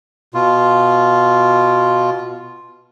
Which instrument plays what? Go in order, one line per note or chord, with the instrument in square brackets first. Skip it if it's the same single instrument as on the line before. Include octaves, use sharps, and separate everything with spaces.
[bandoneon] B2 F4